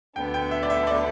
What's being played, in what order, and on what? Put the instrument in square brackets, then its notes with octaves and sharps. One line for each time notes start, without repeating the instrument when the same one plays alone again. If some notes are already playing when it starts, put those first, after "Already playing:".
[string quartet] D2 D3 B3 D4 [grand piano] G5
[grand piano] G5
E5
D5
E5
D5